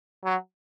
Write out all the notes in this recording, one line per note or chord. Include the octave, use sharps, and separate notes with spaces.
F#3